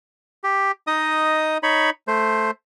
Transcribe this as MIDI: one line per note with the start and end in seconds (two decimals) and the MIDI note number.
0.44 0.72 67
0.87 1.58 63
0.87 1.58 75
0.87 1.58 87
1.63 1.90 63
1.63 1.90 73
1.63 1.90 83
2.08 2.51 57
2.08 2.51 72